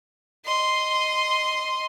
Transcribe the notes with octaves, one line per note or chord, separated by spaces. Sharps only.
D#5 C6